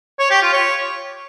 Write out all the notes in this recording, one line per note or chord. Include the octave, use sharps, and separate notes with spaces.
C#5
G4
F4
C#5